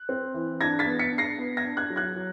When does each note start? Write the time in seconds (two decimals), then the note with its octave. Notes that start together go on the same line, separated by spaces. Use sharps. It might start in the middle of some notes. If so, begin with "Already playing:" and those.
Already playing: F#6
0.09 C4
0.34 E3
0.61 D4 G#6 A#6
0.79 A6 B6
0.86 B3
0.99 B6 C#7
1.12 D4
1.18 A#6 C7
1.38 B3
1.57 G#6 A#6
1.64 D4
1.77 F#6 G#6
1.90 F#3
1.96 F#6 G#6
2.16 F#3